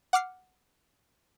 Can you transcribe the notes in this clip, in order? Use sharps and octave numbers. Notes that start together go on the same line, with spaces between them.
F#5 D6 F6 C7